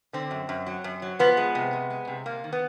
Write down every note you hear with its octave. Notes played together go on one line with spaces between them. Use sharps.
D3 C4
F#2
F#2
F#3
F#2
F#3
F3 B3
G#3
C3
G#3
G#3
C3
C3 A#3
D#3
B3